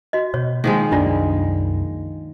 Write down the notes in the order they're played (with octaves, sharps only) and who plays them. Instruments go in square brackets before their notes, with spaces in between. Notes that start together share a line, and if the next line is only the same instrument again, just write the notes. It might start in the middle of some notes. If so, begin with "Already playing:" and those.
[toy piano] F#4 D#5
[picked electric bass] B2 [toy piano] C#5
[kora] D#3 F3 G#3 [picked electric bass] A#3
[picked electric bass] C2 F#2 A#3 [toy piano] D4 F4 D5